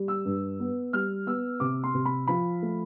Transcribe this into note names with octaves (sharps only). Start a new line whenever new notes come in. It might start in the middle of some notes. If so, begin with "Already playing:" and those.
Already playing: G3
E6
G2
B3
G3 F6
B3 E6
C3 D6
C6
C3
B5
F3 B5
A3